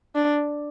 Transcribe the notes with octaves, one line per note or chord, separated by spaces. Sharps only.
D4